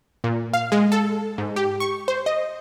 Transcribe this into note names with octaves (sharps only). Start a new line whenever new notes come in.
A#2
F5
G#3
A4
G#2
G4
C#6
C5
D#5